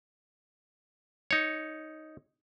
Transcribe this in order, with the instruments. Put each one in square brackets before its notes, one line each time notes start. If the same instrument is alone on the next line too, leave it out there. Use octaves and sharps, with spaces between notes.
[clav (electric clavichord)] D#4 C#5